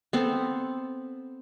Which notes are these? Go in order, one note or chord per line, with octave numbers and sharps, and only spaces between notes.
B3 C4 A4